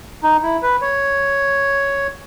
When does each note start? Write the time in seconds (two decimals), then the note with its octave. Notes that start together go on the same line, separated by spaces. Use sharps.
0.23 D#4
0.43 E4
0.62 B4
0.82 C#5